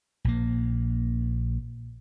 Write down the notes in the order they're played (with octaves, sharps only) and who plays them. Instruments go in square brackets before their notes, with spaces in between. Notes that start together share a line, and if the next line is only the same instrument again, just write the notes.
[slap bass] A#1 A#3